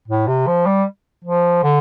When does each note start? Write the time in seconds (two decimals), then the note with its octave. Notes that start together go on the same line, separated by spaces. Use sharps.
0.08 A2
0.27 C3
0.47 F3
0.66 G3
1.25 F3
1.63 D3